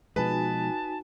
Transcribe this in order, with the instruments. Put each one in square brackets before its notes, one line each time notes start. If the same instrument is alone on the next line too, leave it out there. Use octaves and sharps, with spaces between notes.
[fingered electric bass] B2 F3 G#3 [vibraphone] D#4 F#4 G#5 [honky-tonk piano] B4 [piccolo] A5